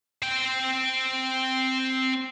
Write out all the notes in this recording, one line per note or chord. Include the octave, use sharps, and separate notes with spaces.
C4 G5